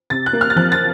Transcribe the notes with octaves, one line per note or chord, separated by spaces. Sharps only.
C3 A6
F#6
A#3
F6
A6
F3 F#6
A6